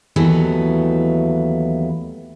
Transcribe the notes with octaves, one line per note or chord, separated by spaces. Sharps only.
D#2 E3 F#3 A3 B3